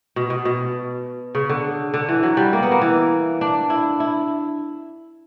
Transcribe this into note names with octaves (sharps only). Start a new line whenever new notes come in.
B2
B2
B2
C#3
D3
D3
E3
F#3
G3
A#3
B3
A#3
E3
D4
E4
E4